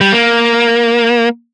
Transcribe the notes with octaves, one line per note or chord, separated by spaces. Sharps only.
G3
A#3